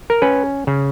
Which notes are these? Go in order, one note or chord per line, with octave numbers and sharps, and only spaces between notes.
A#4
C#4 B4
C#3